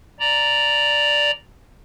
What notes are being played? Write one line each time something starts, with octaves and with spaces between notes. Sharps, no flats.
D5 A#5